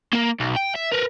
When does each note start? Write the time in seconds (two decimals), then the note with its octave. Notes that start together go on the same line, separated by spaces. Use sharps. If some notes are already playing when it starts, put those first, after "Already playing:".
0.13 A#3 A#4
0.40 B1
0.56 G5
0.75 E5
0.91 A#4 B4